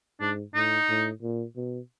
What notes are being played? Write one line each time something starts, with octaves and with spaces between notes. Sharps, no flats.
G#2 D4
A2 D#4
A2
A#2
B2